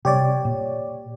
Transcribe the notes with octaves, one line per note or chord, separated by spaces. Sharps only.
C3 G3 C4 G4 C#5 D5
A#2